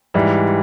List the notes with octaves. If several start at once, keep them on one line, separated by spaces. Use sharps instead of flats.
G#2 E3 G3